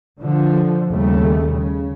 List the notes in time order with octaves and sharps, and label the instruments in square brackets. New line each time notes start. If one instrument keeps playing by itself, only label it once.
[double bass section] D3 F3
D#2 C#3 G3 A3
C#3